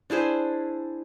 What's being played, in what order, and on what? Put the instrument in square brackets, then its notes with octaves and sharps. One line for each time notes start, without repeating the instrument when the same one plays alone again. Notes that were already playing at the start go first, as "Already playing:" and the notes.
[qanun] D4 E4 G#4 C5